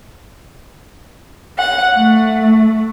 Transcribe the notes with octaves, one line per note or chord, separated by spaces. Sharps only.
F#5
A3